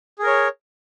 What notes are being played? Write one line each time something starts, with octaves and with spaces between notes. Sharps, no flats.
G#4 A#4 C#5